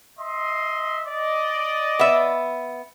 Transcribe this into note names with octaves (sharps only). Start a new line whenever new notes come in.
D#5 E5 C6
D5 D#5
B3 E5